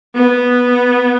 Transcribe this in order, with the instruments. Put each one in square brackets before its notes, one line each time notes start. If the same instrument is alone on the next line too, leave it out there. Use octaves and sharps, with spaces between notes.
[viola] B3